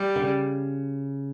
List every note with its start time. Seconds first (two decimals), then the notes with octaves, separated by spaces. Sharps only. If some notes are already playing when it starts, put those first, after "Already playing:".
Already playing: G3
0.16 D3
0.22 C#3